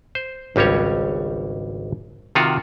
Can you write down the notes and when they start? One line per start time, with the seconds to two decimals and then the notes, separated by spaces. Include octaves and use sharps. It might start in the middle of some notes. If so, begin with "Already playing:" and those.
0.15 C5
0.56 G#1 C#2 G3 C#4 C#5
2.35 C3 D#3 F4 F#4